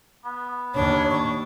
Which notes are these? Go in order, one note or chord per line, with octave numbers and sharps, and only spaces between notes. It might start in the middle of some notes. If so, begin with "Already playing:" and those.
B3
D#2 D4 C#5
C#6